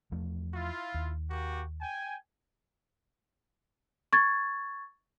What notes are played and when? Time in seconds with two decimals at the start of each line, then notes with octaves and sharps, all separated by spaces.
0.12 E2 F3 A3
0.54 E4 F4
0.94 D#2
1.30 A#3 F#4 G4
1.81 G5 G#5
4.13 C#6 G#6 A6